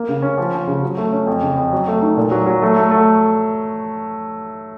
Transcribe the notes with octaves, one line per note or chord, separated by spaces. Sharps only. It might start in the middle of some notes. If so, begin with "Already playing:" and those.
Already playing: A#3
C#3
C#4
F3
F3
C#3
F#3
A3
C#4
F2
C#3
F2
F#3
A3
D#4
A#2
F#3
F#3
A3
A3
A3